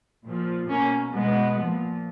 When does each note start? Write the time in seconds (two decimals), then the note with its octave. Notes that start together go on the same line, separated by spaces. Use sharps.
0.24 A#2 F3
0.69 B2 A#3 C#4
1.14 B2 G#3 B3
1.59 A#2 F3